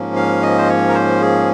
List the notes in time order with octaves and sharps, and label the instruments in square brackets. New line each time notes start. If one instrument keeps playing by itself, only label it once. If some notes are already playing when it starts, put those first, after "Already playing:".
Already playing: [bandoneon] G#2 F3 A#3 C#4
F5
D#5
C5
C#5
A#4
C5
G#4